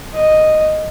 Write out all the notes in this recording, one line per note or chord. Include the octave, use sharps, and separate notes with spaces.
D#5